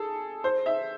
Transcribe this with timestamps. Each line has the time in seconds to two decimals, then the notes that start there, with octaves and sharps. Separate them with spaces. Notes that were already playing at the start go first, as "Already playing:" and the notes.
Already playing: G#4 A4
0.44 C5
0.66 E5